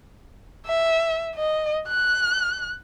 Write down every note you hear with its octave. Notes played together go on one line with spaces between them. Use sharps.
E5
D#5
F#6